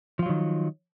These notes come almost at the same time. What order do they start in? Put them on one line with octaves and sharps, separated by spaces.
F3 F4 F#3 D#3